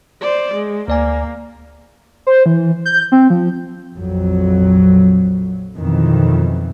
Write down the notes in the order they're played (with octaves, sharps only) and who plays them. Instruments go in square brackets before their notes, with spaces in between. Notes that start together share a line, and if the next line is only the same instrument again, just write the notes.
[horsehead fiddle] C5 D5
G#3
[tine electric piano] D2 D5 G#5 [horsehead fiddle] A#3
[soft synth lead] C5
E3
G6
C4
F3
[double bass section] A#1 F2 F#3
F2 B2 D#3 E3